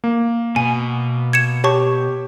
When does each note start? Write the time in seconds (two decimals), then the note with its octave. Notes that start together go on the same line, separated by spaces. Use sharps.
0.04 A#3
0.56 B2 G#5
1.33 G#6 C#7 E7
1.64 G4 C#5 A5 C#6